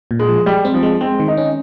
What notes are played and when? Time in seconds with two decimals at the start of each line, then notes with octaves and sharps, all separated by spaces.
0.11 A#2
0.19 G#3
0.29 F3
0.46 G3 G#3
0.65 C4
0.74 F3
0.83 G#3
1.01 G#3 C4
1.20 D#3
1.28 D#4
1.37 C#4